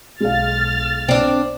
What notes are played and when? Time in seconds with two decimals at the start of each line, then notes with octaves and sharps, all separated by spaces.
0.20 B1 G#3 F5 F6 A6
1.09 C4 D4 D5